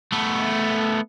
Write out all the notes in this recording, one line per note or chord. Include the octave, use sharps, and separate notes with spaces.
A3 B3